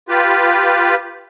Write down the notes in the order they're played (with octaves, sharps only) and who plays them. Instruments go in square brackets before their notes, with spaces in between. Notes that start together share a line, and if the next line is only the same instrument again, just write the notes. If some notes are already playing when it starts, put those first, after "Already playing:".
[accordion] F4 G4 B4